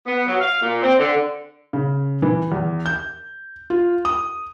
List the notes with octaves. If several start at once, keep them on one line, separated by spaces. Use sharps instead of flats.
B3
F#3
F5
A#2
C4
D3
C#3
E3
E2
G6
F4
D#6